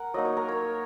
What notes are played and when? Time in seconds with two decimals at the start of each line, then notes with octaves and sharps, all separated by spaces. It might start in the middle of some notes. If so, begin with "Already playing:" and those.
Already playing: A#4 F#5
0.14 F#3 A#3 D#4 D#5
0.25 C#5
0.37 A#4
0.48 C#5